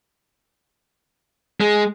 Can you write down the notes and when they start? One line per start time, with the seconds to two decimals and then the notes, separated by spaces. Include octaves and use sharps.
1.60 G#3